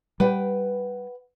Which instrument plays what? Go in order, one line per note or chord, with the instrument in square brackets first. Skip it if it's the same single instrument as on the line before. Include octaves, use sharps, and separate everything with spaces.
[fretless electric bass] G3 [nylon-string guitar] B4 F#5 G5